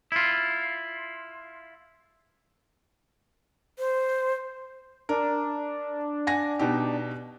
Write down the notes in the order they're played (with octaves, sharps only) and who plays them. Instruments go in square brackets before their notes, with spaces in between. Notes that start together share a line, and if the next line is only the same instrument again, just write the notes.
[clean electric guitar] E4 F4
[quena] C5
[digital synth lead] D4 [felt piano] A#4
[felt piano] F#5 G#5 A#6
B2 D#4 G4